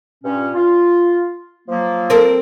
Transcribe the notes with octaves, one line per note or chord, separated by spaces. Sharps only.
G2 A#2 C#4
F4
F3 F#3 A#3
C4 A4 A#4